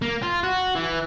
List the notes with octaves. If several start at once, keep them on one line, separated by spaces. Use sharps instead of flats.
A#3
F4
F#4
E3